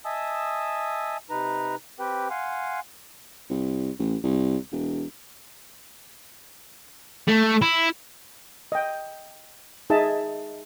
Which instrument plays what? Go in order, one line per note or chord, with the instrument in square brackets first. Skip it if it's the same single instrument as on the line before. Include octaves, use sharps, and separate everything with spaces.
[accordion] D#5 E5 G#5 A5 D#6 E6
C3 D#4 B4 A#5
C4 G4 B4 G5
F5 F#5 G#5 C6
[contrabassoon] C2
A1
C2
E1
[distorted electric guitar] A3
E4
[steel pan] D#5 G5
D#4 G#4 D#5 E5 A5